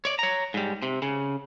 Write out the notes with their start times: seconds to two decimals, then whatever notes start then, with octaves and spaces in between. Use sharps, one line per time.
0.05 C#5 D5
0.19 C#5 A#5
0.54 G#2 G3
0.83 C3
1.02 C#3